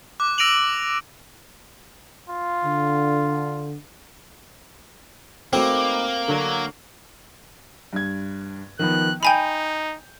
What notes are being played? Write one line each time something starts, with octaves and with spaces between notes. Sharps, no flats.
D6 F#6
E6 A#6 D7 D#7 F7 F#7
F4
D3
A3 A#3 C4 D#4 F#4 A4 B4 D6
D3 F#3 D4 A4
G2 G#6
D#3 F3 B3 F#6
D#4 G5 G#5 B5 G6 F7